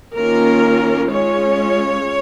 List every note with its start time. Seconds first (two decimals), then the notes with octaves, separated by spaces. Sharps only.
0.15 D#3 A#3 C#4 F4 A#4
1.11 G#3 C#4 F4 C#5